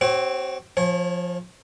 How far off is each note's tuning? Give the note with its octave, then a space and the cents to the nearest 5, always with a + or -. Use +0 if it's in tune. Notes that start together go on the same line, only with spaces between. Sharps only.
C4 +0 F#4 +45 C#5 -25
F3 +10 C#5 -35 G#5 +0